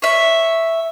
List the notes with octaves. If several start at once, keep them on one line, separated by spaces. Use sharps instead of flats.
C#5 E5